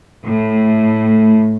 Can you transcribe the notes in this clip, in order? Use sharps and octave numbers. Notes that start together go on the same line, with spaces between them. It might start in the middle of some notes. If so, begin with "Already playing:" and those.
A2